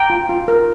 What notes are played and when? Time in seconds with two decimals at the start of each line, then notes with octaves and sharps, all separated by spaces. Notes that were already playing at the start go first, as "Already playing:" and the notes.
Already playing: G5 A#5
0.10 F4
0.29 F4
0.48 A#4